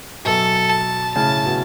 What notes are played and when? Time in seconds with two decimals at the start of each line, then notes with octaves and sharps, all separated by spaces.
0.25 F#2 B2 A4
0.70 A5
1.15 A2 C#3 A5
1.46 B2